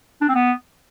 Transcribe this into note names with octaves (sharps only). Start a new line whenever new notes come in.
D4
C4
B3